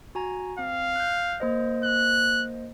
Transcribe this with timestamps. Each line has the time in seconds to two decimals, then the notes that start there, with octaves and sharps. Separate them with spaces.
0.15 F#4 G#5 A#5
0.59 C4 F5
0.96 F#6 G6
1.40 A#3 C5 D#5
1.84 F#6